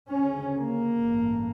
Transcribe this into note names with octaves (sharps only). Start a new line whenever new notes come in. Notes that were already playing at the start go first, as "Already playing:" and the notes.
D2 C#3 C#4
A#3
A1 G2